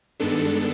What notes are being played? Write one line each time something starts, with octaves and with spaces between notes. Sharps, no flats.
G2 D#3 G#3 B3 D4 A4